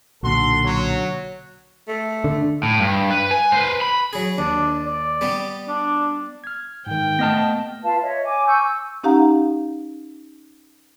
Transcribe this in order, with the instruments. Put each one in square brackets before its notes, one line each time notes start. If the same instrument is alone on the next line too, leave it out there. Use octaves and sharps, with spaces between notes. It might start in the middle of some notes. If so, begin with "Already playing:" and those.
[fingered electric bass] B1 A#2 D3 [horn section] F#4 A4 C6
[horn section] F#3
[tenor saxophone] A3
[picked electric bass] D3
[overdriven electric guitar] A2
G2
B4
G#5
B4 C5
B5
[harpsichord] F#3 G#4
[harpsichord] D#2 [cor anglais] D4
[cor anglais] D5
[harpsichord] G3 B3 G4
[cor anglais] D4
[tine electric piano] F6 G#6
[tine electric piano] G#2 D#3 [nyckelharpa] G5
[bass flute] A3 [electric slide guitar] B3 D#5 A5 [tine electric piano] F6 A#6
[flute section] F4 B4 F5 A5
C#5 D#5 E5
G#5 D6
G#5 C#6 E6 G6
E6
[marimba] C#4 D#4 G4 F5 F#5 A#5